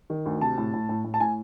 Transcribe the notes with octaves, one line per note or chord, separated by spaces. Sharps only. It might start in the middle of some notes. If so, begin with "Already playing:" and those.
D#3
D2
C3 A5
A2
A2
A2
A2
A5
A2 G#5